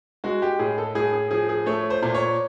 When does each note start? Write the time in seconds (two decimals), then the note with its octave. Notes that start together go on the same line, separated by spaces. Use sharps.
0.24 G#3 F#4
0.42 G4
0.59 A2 G#4
0.78 A4
0.95 A2 G#4
1.13 G#4
1.31 F3 G#4
1.49 G#4
1.66 A3 C#5
1.90 C5
2.03 A#2
2.15 C#5